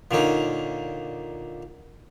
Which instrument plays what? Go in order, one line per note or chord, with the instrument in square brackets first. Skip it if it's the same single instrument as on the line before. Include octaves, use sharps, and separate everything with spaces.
[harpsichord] A#2 D3 C#4 D#4